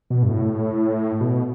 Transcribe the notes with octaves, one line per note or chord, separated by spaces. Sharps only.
B2
G2
A2
B2